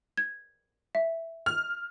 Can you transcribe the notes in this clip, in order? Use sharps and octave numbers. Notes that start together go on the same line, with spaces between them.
G#6
E5
F6